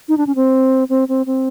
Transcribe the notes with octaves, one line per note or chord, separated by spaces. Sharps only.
D#4
D4
C#4
C4
C4
C4
C4